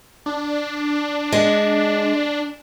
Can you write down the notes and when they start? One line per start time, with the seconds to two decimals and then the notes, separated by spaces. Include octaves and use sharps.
0.26 D4
1.32 G#3